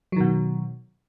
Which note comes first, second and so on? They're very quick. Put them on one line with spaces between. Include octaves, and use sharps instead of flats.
F#3 D#3 B2